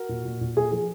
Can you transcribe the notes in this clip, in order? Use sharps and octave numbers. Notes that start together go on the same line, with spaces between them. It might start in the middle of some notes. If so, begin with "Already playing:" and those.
Already playing: F#4 A#4
A#2
A#2
A#2
A#2 G#4
F3 G#4